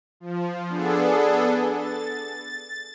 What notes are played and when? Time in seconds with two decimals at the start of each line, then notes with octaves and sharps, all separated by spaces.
0.20 F3
0.68 B3 D4 G#4 A4
1.76 A6